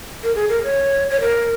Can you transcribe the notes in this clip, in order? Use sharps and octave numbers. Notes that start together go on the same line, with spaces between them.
A#4
G#4
A#4
C#5
C#5
A#4